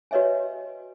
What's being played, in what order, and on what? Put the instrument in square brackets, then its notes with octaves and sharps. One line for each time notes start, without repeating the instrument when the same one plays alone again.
[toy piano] F#4 B4 C#5 D#5 E5 G#5